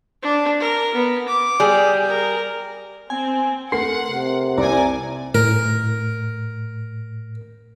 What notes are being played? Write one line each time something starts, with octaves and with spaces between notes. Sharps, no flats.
D4
A#4
B3
D6
G3 G#4
A#4
C4 G#5
A3 A#4 F#5 C6 C7
C3
C2 D5 G#5 A#5
A2 A#4